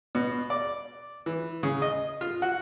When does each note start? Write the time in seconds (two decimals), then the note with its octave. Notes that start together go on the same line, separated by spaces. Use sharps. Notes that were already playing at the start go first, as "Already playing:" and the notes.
0.15 B2
0.50 D5
1.26 E3
1.63 C#3
1.82 D#5
2.21 F4
2.42 F#4